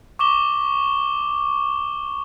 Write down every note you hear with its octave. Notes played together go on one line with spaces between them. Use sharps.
C#6 D6 E7 G7